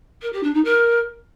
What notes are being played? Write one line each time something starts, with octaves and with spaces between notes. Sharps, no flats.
A#4
G4
D4
D#4
A#4